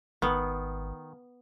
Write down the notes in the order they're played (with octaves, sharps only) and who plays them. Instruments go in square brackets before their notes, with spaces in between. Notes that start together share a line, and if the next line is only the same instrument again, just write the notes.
[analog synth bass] G#1 [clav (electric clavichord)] D#3 [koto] B3